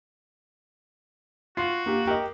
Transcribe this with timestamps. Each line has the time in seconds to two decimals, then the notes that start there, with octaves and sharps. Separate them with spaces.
1.57 F4 F#4 C7
1.86 A#3 G4
2.07 G4 A#4 D#5